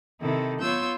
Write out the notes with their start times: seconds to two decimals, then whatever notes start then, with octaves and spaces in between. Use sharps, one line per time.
0.20 C3 D#3 E4 A4
0.61 B3 F4 C#5 C6 E6 G6